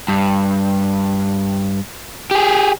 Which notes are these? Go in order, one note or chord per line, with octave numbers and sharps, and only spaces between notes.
G2
G4 G#4